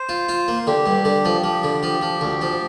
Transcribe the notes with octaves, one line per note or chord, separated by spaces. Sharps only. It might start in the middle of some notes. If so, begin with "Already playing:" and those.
Already playing: C5
F4
F4
A#3
D3 G4
G2
D3
F3
F3 G4
D3
F3
F3
D2
F3